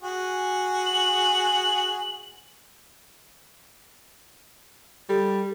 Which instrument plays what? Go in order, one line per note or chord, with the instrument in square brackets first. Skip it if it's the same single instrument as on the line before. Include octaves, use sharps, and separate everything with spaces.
[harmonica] F#4 G#4 G#5
[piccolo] F#7
[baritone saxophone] G3 [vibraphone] A4